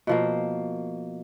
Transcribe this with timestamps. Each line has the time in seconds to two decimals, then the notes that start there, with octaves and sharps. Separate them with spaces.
0.07 B2 F3 A#3